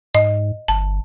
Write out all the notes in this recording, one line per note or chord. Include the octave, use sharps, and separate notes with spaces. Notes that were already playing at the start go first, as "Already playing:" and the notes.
G#2 D#5
G1 A5